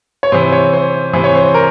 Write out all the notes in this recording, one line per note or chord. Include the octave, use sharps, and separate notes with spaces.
C#5
C3 E3 C5
C#5
C5
C3 E3 C5
C#5
C5
A#4